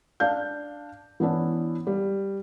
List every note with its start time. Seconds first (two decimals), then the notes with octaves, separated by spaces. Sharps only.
0.20 D4 F5 G6
1.20 E3 B3 C#4 D4 E4
1.87 G3